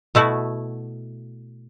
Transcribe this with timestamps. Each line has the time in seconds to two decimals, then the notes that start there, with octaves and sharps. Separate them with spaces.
0.15 B2 A3 E4 F#4